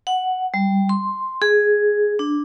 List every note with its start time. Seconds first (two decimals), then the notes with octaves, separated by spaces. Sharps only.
0.07 F#5
0.54 G3
0.89 C6
1.42 G#4
2.19 D4